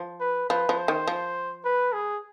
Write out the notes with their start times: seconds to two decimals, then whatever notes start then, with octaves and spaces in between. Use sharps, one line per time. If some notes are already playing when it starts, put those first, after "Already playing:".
Already playing: F3
0.20 B4
0.50 F3 B4
0.69 F3
0.78 C5
0.88 D#3
1.07 F3
1.65 B4
1.93 G#4